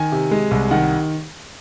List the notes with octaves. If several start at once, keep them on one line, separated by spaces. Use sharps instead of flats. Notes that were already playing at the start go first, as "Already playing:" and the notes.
Already playing: D#3 G#5
C3
G#3
C2
D#3 F#5